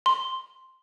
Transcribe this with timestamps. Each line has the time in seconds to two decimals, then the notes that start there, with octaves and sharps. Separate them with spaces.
0.06 C6